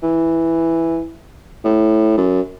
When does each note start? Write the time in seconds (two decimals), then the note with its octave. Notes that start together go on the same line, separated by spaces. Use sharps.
0.03 E3
1.64 A2
2.18 F#2